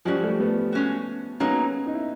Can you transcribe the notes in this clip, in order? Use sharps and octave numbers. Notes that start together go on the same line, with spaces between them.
F3 G3 G#3 C#4 F#4
G3 A3
A3 B3
G#3 C#4 F#4
F#3 A#3 B3 C#4 D#4 G#4
D#4
E4